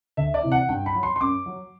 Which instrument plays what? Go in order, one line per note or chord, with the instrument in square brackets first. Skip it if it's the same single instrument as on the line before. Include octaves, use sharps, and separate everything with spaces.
[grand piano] D2 E5
D5
C3 E3
F#5
G2 G5
B5
F#3
C6
C6
F#2 D6
F#3